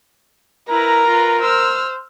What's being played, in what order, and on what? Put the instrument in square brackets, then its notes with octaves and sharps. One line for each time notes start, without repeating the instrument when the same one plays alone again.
[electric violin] E4 B4 [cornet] A#4 [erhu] A#5
[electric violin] F4 B4
[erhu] C5 [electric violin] E6 F6